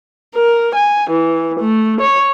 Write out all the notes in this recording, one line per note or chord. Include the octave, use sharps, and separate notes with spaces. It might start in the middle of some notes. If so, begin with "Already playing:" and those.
A#4
G#5
E3
A3
C#5